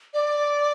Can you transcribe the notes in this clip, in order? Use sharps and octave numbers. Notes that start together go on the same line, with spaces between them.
D5